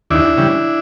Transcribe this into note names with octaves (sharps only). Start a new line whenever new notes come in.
D#2 D4 E4
C#3 E3 G3